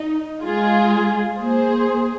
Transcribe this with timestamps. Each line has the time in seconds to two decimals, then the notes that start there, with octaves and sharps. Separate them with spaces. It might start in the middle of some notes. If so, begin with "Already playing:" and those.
Already playing: D#4
0.44 G#3 F4 G#4
1.38 A#3 G#4 C5